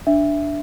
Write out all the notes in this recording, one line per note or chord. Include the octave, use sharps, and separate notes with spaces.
D4 E5